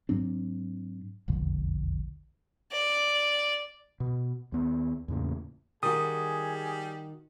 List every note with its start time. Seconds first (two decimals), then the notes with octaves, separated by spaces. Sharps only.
0.09 G#2 F#3 C4 D4
1.28 E1 A#1 F2 D3
2.72 D5
4.00 B2
4.52 D#2 B3
5.08 E2 A2 C#3 A#3
5.83 D#3 G3 F#4 G#4 D#6